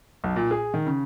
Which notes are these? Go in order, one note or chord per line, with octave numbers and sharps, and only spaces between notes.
B1
A#2
G#4
D#3
C#3